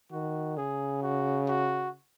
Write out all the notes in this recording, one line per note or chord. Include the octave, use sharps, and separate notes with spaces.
D#3 F#4
C#3 G#4
F#4
F#4